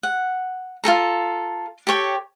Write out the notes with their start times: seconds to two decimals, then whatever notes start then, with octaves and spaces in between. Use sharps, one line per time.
0.03 F#5
0.84 F4 G#4 A4 A#5
1.87 G4 A4 C#5 G5